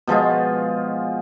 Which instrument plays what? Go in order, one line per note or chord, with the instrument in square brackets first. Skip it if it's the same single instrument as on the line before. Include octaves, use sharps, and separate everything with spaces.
[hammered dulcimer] B2 F3 G#3 F4